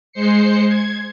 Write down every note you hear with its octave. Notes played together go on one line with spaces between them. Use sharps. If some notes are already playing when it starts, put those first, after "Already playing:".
G#3 C5 C7 C#7
G#6